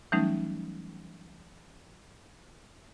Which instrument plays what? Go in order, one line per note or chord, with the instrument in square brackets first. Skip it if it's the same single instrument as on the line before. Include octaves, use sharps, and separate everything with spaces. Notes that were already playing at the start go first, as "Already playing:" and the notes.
[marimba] E3 F#3 G3 A3 C#4 D#4